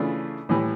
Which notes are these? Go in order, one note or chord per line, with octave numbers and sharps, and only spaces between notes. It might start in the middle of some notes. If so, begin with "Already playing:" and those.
Already playing: C#3 E3 A3 D4 F4
A2 E3 G3